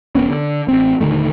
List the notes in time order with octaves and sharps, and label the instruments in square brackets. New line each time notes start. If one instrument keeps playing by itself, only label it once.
[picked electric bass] F1 E2 B3 C#4
D3
A1 C4
D#1 D3 D#3 A3